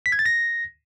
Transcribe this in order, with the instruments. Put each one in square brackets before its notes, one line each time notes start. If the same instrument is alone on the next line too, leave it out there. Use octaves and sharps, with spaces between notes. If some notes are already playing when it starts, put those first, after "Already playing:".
[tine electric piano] B6
G#6
A6
A#6